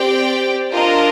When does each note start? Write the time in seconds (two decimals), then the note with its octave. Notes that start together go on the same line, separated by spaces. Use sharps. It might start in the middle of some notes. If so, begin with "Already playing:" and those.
Already playing: C4 G4 D5 G5
0.71 D4 F4 A#4 D#5